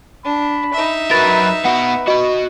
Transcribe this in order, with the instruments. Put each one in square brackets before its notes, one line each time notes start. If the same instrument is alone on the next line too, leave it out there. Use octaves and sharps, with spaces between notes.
[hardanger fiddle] D4 [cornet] B5
[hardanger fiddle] D#4 E5
[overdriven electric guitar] F#3 A#4 [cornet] B4 [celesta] A6
[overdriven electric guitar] B3 F#4 [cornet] B4 [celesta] F#5
[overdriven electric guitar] F#4 B5 [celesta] D#5